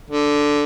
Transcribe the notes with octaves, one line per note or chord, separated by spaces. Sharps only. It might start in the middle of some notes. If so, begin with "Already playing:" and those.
D3